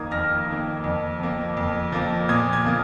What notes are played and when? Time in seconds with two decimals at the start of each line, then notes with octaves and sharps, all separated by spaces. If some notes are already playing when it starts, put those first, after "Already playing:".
Already playing: F2 D#3 A#3 F5 A#5 D#6 G#6
0.11 F2 F6 A#6
0.47 D#3 A#3
0.84 F2
1.20 F3 A#3
1.57 F2
1.92 F3 A#3
2.29 A#2 D#6 G#6
2.52 D#6 G#6
2.65 F3 A#3